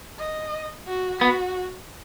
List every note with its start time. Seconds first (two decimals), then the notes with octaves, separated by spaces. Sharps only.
0.19 D#5
0.87 F#4
1.21 B3 F#4